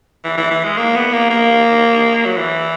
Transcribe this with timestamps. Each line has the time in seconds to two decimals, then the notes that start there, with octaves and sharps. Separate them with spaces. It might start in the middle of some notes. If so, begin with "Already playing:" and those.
0.24 E3
0.37 E3
0.50 E3
0.64 G#3
0.77 A#3
0.95 B3
1.13 A#3
1.30 A#3
2.25 F#3
2.37 E3